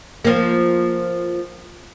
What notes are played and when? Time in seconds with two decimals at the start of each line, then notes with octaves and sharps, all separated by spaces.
0.25 F3 A#3